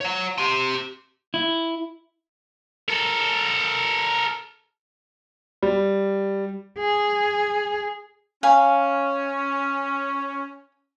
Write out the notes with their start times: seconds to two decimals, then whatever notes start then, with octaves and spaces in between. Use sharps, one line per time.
0.01 C#5 F#5
0.38 G4 C6
1.34 E4
2.89 A4 A#4
5.63 G3
6.79 G#4
8.43 C#4 F5 G#5 B5